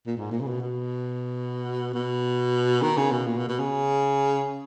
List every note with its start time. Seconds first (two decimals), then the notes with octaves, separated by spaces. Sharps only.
0.07 A#2
0.17 G#2
0.32 A#2
0.40 C#3
0.47 B2
0.61 B2
1.94 B2
2.82 D#3
2.97 C#3
3.12 B2
3.27 A#2
3.38 B2
3.49 B2
3.59 C#3